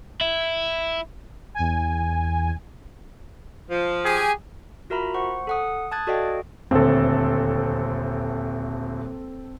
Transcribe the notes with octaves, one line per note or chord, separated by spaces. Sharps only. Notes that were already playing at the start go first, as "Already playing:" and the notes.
E4
E2 G#5
F3
G4 G#4 G#5
F4 F#4 A#4 E5 A#5 B5
C5 F#5 C#6
A4 F#5 D#6
A5 D#6 F#6 G#6 A6
F#4 A4 D5 D#5 F5 G5
D#1 D2 C4 A4